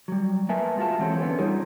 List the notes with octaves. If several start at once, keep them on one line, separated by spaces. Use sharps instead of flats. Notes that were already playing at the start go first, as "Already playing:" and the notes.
F#3 G3
A#3 A#4 B4 E5 G#5 A5
G#3 F4 F#4 A5
E3 F#3 C4 G4 A4
D3 B3 C#4
G3 D#4 F4 G4 G#4 A#4